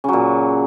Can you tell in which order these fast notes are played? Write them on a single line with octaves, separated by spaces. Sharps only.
C#3 F#3 A#2